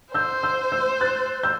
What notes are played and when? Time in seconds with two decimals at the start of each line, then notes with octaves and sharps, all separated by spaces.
0.14 C5 E6 G6
0.43 E6 G6
0.72 E6 G6
1.01 F#6 A6
1.43 E6 G6